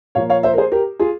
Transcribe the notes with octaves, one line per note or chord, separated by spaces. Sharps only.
A#2 F3 A#3 C#5 F5
C#5 F5
C5 E5
A#4
G#4 C5
G4 A#4
F4 G#4